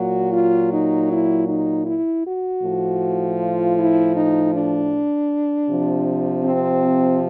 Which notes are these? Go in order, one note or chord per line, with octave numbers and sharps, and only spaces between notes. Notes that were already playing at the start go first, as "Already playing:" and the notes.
Already playing: A#2 F#3 F#4
F4
D#4
E4
D#4
E4
F#4
A2 F3
F4
E4
D#4
D4
C3 F3
C4